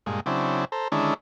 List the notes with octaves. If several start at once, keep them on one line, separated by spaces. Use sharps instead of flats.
G2 A#2 G#3
C#3 F#3 C4 D4 E4
A4 C5 A#5
D3 D#3 G#3 C#4 D4 E4